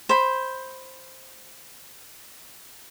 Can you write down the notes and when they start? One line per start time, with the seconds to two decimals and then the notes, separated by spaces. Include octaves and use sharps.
0.09 C5 B5